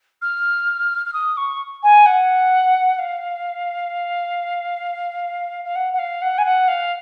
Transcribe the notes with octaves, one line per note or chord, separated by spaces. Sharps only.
F6
F6
D#6
C#6
G#5
F#5
F5
F5
F#5
F#5
F5
F#5
G#5
F#5
F5